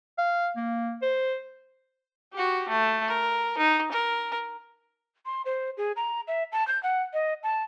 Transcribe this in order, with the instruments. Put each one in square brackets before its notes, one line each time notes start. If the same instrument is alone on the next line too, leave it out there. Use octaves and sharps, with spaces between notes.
[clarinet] F5
A#3
C5
[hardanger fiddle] F#4 G4
A3
A#4
D#4
A#4
[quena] C6
C5
G#4
A#5
E5
A5
G6
F#5
D#5
A5